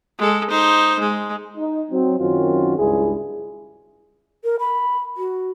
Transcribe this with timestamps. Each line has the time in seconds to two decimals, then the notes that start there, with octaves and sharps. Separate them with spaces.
0.18 G#3 A4
0.50 D#4 C5
0.99 G#3
1.56 D#4
1.90 F#3 C4
2.19 F#2 D#3 C4 C#4 F4 F#4
2.78 C#2 G2 D4 E4 G#4
4.44 A#4
4.60 B5
5.17 F#4